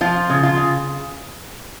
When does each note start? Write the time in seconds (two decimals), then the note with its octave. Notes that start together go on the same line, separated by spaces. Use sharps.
0.01 F3 F4
0.30 C#3
0.43 F4
0.57 C#3